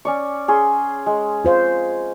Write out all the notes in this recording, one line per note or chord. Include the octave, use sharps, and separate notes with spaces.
C#4 D5 C#6
C#4 G#4 C6
G#3
F4 C5 F5